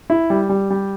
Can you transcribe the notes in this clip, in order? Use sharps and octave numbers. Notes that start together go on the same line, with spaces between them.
E4
G3
G3
G3